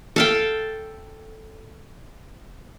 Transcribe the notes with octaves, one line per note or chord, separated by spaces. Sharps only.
A4 F5 G5